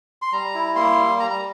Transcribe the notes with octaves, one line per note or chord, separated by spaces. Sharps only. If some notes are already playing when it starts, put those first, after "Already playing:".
C6
G3 A#5
E4
A#3 C6
G3
G3 A#5
A#5